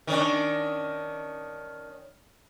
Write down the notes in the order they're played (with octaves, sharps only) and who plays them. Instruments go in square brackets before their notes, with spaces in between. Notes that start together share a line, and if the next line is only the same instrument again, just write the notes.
[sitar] D#3 C#4 D4